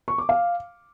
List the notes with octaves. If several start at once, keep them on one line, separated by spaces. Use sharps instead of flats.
C#6
D6
F5